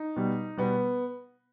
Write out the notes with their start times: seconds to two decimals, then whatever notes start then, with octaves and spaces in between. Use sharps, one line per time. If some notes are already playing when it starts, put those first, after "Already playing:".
Already playing: D#4
0.16 B2 G3
0.57 B2 G3 B3